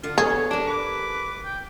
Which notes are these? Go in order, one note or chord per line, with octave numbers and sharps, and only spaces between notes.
D3 D4 F4 F#5
B3 G#4 A4 C#5
D4 G4 A#4
B4 D6
G5